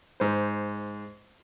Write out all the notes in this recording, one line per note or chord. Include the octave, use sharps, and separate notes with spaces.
G#2 C5